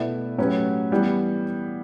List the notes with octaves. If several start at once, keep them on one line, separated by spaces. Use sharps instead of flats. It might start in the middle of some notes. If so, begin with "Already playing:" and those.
Already playing: B2 A3 E4 B4 D5
A2 F#3 C#4 G4 B4
E3 G3 B3